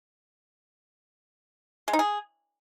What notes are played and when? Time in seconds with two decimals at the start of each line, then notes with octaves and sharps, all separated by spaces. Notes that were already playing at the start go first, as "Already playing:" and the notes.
1.88 G#3
1.93 D#4
1.99 G#4